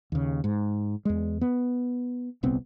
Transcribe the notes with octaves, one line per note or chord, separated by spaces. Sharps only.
D#2 C#3
G#2
E2 G#3
B3
D#1 C2 B3 C4